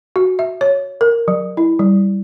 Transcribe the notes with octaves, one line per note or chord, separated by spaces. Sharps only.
F#4
E5
C#5
A#4
F#3
E4
G3